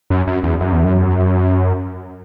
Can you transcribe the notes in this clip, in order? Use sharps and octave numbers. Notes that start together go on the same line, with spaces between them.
F#2
F#2
E2
F#2
E2
F#2